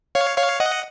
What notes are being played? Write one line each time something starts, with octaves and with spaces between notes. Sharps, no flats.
C#5 F5
C#5 F5
D#5 F#5